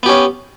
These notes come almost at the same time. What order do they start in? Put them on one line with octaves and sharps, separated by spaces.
B3 G4 C#4